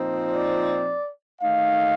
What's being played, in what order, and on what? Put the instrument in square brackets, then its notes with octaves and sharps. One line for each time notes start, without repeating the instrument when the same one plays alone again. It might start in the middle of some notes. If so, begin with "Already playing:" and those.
Already playing: [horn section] A#2 F3 C4 D#4
D5
D#3 A3 D#4 F5